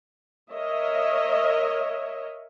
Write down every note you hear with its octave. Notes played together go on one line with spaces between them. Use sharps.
A#4 C#5 D#5 E5